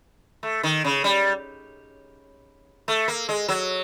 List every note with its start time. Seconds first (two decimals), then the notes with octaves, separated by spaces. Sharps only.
0.43 A3
0.63 D#3
0.84 C#3
1.04 G3
2.88 A3
3.08 A#3
3.29 G#3
3.48 F#3